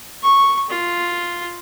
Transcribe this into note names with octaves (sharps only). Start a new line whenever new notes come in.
C#6
F4